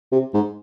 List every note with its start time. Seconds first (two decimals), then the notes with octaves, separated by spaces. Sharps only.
0.12 C3
0.34 G#2